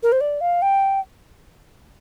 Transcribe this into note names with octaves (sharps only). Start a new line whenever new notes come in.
A#4
C5
D5
F5
G5